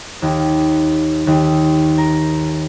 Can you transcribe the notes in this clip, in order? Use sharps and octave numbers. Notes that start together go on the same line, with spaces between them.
D#2
D#2
A#4